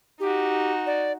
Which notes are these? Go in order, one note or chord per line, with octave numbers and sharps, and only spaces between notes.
D#4 F#4 G4
D5